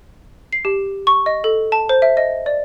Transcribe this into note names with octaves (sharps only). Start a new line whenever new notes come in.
C7
G4
C#6
D#5
A4
A5
C5
E5
D#5
D5